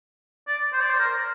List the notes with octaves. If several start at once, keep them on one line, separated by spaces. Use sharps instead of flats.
D5
C5
D5
C5
A#4